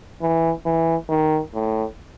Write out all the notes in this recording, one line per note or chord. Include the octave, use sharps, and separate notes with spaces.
E3
E3
D#3
A2